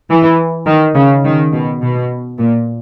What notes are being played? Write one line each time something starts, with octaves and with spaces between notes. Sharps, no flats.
E3
D#3
C#3
D#3
B2
B2
A#2